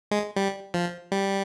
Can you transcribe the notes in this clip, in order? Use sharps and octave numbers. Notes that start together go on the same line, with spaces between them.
G#3
G3
F3
G3